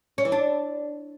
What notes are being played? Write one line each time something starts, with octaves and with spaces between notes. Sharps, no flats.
C#4
E3
D4